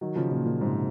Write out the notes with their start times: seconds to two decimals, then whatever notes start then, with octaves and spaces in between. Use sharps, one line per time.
0.01 D#3 F#3
0.16 C#3 F3
0.31 A#2 C#3
0.45 A#2 C#3
0.61 G#2 C3